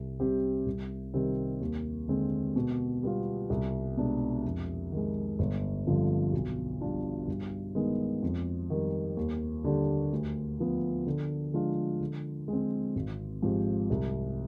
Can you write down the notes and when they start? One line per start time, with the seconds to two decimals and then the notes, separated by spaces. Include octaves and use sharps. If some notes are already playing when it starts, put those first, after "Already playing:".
Already playing: C2
0.20 C3 G3 C4 G4
0.66 C2
1.14 C3 D#3 G3 C4
1.61 D#2
2.08 D3 G#3 C4
2.56 B2
3.03 G3 B3 F4
3.50 C2
3.97 B2 G#3 D4
4.45 F2
4.92 D#3 G#3
5.39 G1
5.86 G2 D3 F3 C4
6.33 B1
6.81 B2 G3 D4 F4
7.28 G2
7.75 D#3 G#3 B3 D#4
8.22 F2
8.70 D#3 G3
9.17 D#2
9.64 D3 G3 D4 G4
10.12 D2
10.58 D3 F3 B3
11.06 D3
11.54 F3 G#3 D4 F4
12.00 D3
12.48 G#3 C4
12.95 G#1
13.42 G#2 F3 C4 G4
13.90 C2